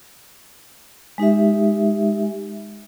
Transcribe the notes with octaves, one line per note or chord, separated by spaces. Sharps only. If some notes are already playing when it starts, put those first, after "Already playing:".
G#3 D#4 G4 E5